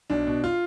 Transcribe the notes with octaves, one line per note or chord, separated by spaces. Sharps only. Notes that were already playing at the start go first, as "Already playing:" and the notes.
B1 D4
B2
F4